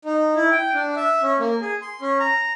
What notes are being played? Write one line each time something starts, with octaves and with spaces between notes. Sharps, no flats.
D#4
E4
G5
D4
E5
C#4
A#3
G#4
C6
C#4
A#5